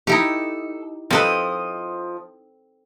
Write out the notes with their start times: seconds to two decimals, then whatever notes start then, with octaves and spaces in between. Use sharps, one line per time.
0.07 D#4 E4 G4 A4
1.11 F3 C4 A4 B4 D#5